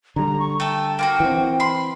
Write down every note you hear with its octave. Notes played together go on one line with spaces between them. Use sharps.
D3 G3 A#5
C#6
A3 A4 G5
A#3 F4 F#4
E3 C4
B5 C6